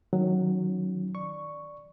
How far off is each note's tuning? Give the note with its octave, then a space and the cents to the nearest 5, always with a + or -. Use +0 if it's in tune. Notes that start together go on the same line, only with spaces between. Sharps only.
D#3 +5 F#3 -5 C#4 +0
D5 +0 C#6 +0